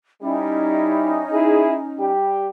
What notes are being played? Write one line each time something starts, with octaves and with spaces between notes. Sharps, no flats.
G3 C#4 D#4 E4
E4 G#4
G3 G4